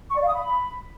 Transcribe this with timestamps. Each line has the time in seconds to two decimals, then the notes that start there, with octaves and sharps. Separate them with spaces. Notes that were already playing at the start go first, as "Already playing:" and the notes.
0.10 C#6
0.16 D5
0.22 F5
0.28 D#6
0.34 B5